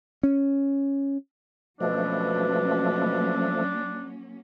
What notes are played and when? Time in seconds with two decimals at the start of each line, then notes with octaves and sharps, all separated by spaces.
0.23 C#4
1.81 B2 F3 F#3 A3 A#3 C#4 D4